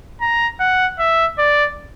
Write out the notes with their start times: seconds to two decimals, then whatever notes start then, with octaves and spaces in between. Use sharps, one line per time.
0.21 A#5
0.60 F#5
0.99 E5
1.38 D5